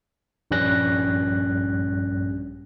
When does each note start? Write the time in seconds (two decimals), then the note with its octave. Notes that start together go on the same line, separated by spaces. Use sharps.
0.51 A#1 G2 G3 C#4 F#6 A#6